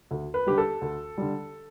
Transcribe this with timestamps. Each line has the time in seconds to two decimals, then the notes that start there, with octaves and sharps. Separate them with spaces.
0.11 D2
0.34 B4
0.46 D3 G3 G4
0.58 A4
0.81 D2
1.18 D3 G3